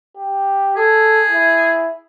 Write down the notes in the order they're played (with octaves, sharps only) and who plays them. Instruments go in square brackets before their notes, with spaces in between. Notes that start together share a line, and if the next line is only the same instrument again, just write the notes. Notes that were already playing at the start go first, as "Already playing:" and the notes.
[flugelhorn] G4
[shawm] G#4 [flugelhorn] A4
[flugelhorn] E4